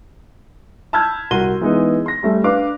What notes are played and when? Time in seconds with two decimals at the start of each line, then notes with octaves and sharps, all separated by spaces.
0.93 A5 B5 E6 F6 G6 G#6
1.31 C2 F#4 A#4 C6 D#7 G7
1.61 E3 G#3 B3 D#4
2.06 C6 A#6
2.23 G3 A3 C#4
2.44 D4 B4 F5 D6